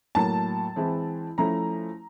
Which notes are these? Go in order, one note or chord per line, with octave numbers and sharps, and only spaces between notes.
A2 F#3 A#3 A5
E3 G#3 C4 E4
F3 A3 C#4 E4 A#5